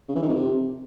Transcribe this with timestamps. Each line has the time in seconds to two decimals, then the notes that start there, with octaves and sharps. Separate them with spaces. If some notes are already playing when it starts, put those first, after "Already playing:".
0.09 C#3
0.15 E3
0.22 D#3
0.29 F2
0.36 C3